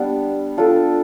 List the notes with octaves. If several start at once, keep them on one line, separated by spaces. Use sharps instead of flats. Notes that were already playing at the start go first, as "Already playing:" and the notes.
Already playing: G3 B3 D4
D4 F4 A4